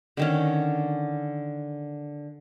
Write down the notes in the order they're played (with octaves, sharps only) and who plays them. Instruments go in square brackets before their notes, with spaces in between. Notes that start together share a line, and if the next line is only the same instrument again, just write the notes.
[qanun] D3 D#3 C#4